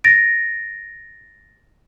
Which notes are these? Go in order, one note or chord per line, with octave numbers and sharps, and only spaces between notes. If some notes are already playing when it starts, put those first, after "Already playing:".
A6 A#6 D7